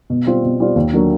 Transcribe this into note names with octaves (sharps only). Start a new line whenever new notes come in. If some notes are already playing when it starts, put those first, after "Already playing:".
B2
G3 C4 F4
B2
G3 C4 F4
D#2
D3 F#3 A#3